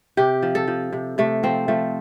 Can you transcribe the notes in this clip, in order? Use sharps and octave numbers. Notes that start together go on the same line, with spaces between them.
C3 G4
F3
A4
F3
C3
C3 A3
F3 C4
F3 A3